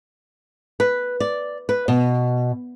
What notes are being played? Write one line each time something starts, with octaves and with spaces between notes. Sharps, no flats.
B4
D5
B4
B2